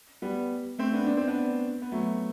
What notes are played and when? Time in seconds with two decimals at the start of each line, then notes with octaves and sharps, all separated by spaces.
0.22 G3 B3
0.78 A3 C4
0.93 B3 D4
1.06 D4
1.17 C4
1.27 B3 D4
1.82 B3
1.92 F#3 A3